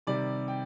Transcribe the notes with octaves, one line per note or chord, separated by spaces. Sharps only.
C3 D#3 G3 D5
G5